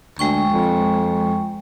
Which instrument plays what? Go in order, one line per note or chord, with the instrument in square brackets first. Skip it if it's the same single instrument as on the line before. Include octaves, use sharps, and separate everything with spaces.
[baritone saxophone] D2 [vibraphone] G#3 G5 C#6
[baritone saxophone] F2